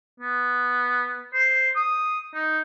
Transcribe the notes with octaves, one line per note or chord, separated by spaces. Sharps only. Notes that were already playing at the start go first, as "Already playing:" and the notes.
B3
C5
D#6
D#4